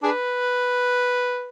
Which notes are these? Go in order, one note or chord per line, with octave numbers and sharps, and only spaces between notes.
D4 G#4 B4